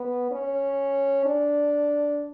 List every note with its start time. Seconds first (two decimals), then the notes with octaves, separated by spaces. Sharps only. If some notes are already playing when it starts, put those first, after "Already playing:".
Already playing: B3
0.32 C#4
1.26 D4